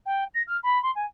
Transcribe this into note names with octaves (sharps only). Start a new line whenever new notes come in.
G5
A#6
F6
B5
C6
G#5